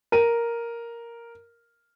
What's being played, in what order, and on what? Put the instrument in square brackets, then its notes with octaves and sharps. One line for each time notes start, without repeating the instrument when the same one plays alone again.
[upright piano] A#4 D#7